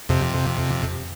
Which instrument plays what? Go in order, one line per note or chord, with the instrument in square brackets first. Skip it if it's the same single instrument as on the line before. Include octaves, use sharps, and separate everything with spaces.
[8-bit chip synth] F2 C3